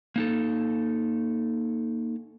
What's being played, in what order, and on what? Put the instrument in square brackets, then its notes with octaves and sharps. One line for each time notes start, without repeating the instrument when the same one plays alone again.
[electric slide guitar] A#3 D#4 A4